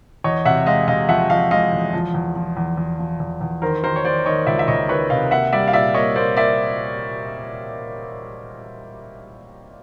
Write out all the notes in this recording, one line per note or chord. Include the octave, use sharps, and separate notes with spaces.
E2 C#5 D#5
C3 E5 F#5
G#3 D#5 F5
C3 D#5 F5
F3 E5 F#5
F3 D#5 F5
G#3 D#5 F5
E2
F3
E2
F3
E2
E2
F3
E2
E2
D#3 A#4 C5
D#3 A#4 C5
C#5
D#3 C5 D5
D#3 C#5 D#5
C#2 D5 E5
E5
C#2 C#5 D#5
D#3 B4 C#5
C3 D#5 F5
A#3 E5 F#5
G3 D5 E5
F5
A#2 D5 E5
A#3 C#5 D#5
A#3 C5 D5
A#3 D5 E5